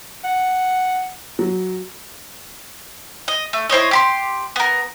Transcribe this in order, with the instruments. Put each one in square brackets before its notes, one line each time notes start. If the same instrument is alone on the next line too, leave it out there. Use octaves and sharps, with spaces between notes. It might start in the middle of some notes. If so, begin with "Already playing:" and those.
[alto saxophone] F#5
[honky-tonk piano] F#3
[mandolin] D#5
A3
E4 C5 C#5 D#5
G4 B5 C6
B3 A#4